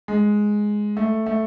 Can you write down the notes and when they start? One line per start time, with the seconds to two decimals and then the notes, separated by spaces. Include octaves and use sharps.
0.08 G#3
0.97 A3
1.26 A3